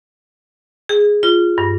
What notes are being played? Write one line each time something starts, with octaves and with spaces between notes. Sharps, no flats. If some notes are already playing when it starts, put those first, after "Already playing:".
G#4
F4
G2